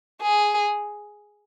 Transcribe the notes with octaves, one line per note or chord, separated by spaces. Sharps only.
G#4